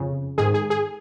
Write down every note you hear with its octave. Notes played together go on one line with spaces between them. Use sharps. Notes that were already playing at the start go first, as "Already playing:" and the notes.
Already playing: F2 C#3
G#2 D#3 G#4
G#4
G#4